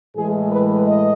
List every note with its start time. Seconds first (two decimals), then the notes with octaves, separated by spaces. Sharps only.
0.16 A2 E3 G#3 G#4
0.50 B4
0.85 D#5